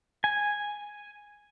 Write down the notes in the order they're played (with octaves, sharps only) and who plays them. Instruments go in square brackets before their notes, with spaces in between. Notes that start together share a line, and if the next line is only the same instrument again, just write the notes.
[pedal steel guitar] G#5